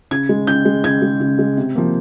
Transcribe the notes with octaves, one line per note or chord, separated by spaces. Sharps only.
C#3 G#6
G#3
C#3 G6
G#3
C#3 G#6
G#3
C#3
G#3
C3
F3 A#3